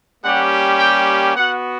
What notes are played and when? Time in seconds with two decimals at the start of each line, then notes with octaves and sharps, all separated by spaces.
0.24 G3 A#3 C#4 G4 F#5
0.80 G5
1.35 B3 F#4 F#5